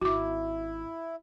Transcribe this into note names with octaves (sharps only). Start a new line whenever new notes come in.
G#1 E4 F#4 D6